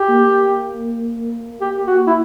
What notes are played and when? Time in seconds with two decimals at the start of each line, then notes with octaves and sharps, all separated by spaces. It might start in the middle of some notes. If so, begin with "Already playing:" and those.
Already playing: G4
0.09 A#3
1.61 G4
1.87 F#4
2.07 E4